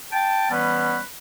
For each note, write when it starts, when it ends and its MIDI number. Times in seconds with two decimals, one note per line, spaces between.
0.12 0.47 79
0.12 0.47 81
0.50 0.98 52
0.50 0.98 55
0.50 0.98 59
0.50 0.98 61
0.50 0.98 71